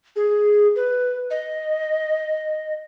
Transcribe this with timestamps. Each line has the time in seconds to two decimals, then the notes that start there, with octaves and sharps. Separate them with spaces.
0.16 G#4
0.76 B4
1.31 D#5